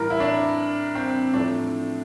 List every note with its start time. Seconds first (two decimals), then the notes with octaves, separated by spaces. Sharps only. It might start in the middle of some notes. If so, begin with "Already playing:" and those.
Already playing: A2 E3 G3 A#4
0.10 E4
0.20 D4
0.95 C4
1.33 A2 F3 A3 D4